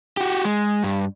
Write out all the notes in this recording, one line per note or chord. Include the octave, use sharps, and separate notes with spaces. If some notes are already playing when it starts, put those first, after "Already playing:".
F#4 G4
G#3
G2